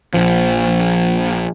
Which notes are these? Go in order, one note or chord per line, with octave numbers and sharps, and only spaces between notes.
A#1 F3